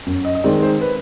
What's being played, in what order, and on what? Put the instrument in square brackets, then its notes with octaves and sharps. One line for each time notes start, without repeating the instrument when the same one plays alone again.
[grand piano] F#2
D#5
D#5
D#3 G#3 C4 D#4 D5
C5
B4